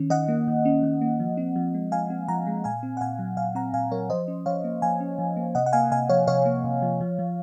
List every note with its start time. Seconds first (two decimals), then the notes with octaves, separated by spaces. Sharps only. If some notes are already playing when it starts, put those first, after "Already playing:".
Already playing: D#3 C#4
0.10 D#3 D#5 F#5
0.28 A#3
0.48 D#3
0.65 C#4
0.83 D#3
1.01 A#3
1.20 F3
1.37 C4
1.56 F3
1.74 G#3
1.92 F3 F5 G#5
2.10 C4
2.28 F3 F#5 A#5
2.47 G#3
2.64 A#2 F5 G#5
2.83 C4
2.97 F#5
3.01 A#2 F5 G#5
3.19 F#3
3.37 A#2 F5 G#5
3.55 C4 F#5 A#5
3.73 A#2 F5 G#5
3.92 F#3 A#4 C#5
4.10 F3 C5 D#5
4.28 C#4
4.46 F3 C#5 F5
4.64 A#3
4.82 F3 F5 G#5
5.00 C#4
5.19 F3
5.37 A#3
5.55 C3 D#5 F#5
5.66 F#5
5.73 A#3 F5 G#5
5.91 C3 F5 G#5
6.09 F3 C#5 F5
6.27 C3 C#5 F5
6.46 A#3
6.64 C3
6.82 F3
7.01 F3
7.19 F3